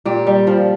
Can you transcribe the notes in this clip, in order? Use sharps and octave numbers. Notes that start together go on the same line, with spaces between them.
A#2 G4
G3
F3